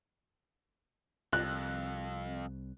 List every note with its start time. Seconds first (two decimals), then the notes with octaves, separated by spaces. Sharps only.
1.33 C2 F2 F#6